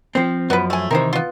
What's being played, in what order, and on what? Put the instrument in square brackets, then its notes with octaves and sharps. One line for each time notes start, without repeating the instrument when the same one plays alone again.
[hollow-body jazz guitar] F3 C4 [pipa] C5
[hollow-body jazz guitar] F#2 F3 [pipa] B3 B4
[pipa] A3 G#5
[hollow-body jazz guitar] C3 D#3 E3 [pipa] A#4 C5
[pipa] B3 F4